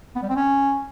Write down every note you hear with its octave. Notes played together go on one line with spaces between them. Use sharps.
B3
G3
C4
C#4